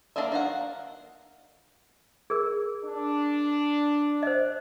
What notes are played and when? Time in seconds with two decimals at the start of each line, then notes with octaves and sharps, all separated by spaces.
0.16 A#3 D4 A#4 D#5 E5
0.32 D#3 F5 F#5
2.30 G#4 A#4
2.84 D4
4.23 C5 D#5